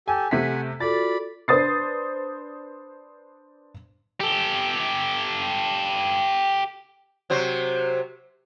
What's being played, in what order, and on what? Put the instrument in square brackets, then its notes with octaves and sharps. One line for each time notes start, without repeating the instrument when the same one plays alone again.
[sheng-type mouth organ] G4 A4 [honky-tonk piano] G#5
[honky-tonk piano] C3 A3 B6 [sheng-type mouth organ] F#5 G#5
[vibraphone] F4 F#4 A4 [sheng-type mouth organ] D5 B5 [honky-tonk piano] A6
[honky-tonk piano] D4 B4 C5 D#6 A6 C7
[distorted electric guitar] G4 A4
[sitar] C3 F#3 C5